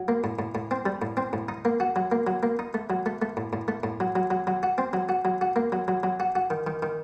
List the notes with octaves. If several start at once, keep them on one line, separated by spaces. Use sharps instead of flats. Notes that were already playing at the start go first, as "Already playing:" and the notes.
Already playing: F#3
A#3
A2
A2
A2
C4
G3
A2
C4
A2
D#4
A#3
F#4
F#3
A#3
F#3
A#3
D#4
A3
F#3
A3
A3
A2
A2
A3
A2
F#3
F#3
F#3
F#3
F#4
C4
F#3
F#4
F#3
F#4
A#3
F#3
F#3
F#3
F#4
F#4
D#3
D#3
D#3